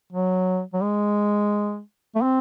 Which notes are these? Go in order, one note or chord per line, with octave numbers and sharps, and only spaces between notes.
F#3
F#3
G#3
A3
C4